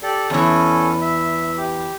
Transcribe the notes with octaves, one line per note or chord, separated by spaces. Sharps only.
G4 A4 D5
E2 E3 C#4 A4
E5
G4